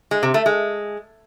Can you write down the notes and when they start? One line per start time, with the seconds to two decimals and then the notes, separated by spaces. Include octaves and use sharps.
0.11 G#3
0.23 C3
0.34 A3
0.46 G#3